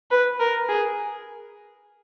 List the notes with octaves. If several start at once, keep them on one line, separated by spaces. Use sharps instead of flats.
B4
A#4
G#4